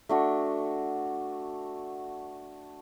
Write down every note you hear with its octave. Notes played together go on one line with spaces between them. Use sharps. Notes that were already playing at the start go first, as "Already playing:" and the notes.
A3 D4 F#4